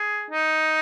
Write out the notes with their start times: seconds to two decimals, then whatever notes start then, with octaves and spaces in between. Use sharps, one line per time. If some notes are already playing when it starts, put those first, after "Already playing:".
Already playing: G#4
0.30 D#4